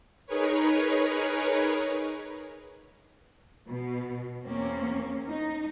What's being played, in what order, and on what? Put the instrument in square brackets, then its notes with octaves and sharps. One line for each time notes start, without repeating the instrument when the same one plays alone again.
[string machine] D#4 G#4 A#4 B4 C#5
[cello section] B2
E2 A#3 C4 C#4
D#4